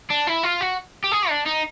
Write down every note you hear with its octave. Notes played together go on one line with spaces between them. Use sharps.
D4
E4
F4
F#4
G4
G#4
D4
D#4